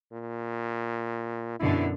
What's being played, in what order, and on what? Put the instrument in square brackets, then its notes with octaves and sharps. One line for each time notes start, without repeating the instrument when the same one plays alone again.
[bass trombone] A#2
[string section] F#2 B2 D3 [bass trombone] E4